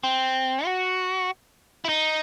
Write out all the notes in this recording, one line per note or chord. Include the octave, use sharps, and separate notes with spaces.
C4
F#4
E4
D#4